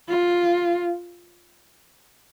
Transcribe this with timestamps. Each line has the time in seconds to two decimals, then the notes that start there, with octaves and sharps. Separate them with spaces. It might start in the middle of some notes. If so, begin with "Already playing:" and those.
0.09 F4